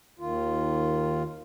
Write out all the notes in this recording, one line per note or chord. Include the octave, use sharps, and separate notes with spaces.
D#2 D#3 F4